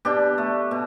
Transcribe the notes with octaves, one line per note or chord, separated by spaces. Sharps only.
B2 D4 G4
A3
B2